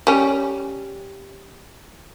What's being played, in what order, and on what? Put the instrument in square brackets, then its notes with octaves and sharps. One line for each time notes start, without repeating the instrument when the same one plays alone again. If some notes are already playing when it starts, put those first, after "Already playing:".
[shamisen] G3 C#4